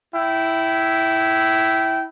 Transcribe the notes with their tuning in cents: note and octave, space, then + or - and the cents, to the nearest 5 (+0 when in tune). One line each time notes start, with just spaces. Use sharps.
E4 +0 G5 -20